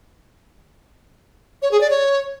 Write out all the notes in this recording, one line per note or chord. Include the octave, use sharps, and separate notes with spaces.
C#5
G#4
D5
C#5